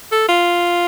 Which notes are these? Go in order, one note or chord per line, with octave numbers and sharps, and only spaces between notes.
A4
F4